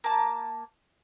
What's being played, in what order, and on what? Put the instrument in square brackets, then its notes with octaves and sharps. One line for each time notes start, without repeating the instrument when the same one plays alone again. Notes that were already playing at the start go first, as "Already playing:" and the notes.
[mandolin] A#3 A5